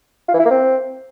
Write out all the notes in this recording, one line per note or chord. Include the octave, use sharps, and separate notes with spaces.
F4
E3
E4
A#3
C4